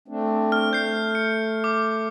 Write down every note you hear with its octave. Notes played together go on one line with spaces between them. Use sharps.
A3 C4 D4
F6
A3 G6 C7
C#7
D6